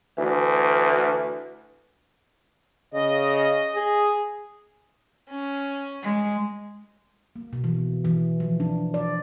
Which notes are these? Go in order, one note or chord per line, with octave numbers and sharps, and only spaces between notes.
D2 E3
C#3 D#5
G#4
C#4
G#3
A#3
B2
E3
E3
F3
D4
D5